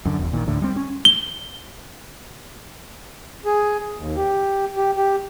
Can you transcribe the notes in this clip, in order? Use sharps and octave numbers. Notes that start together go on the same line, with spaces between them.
F#2 D3
E1 E2
A#1 A#2 D#3
D2 A2 D3
G3 C4
C#4
G7
G#4
D#2
G4
G4
G4